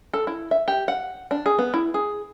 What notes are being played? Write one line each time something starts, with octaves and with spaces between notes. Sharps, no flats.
A4
E4
E5
G4
F#5
D4
G#4
B3
E4
G#4